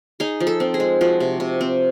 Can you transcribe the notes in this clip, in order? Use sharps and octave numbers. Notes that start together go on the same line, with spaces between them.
D#4 G#4
F3
A4
C4
G#4
G#3
F3 F#4
C3
C3
C4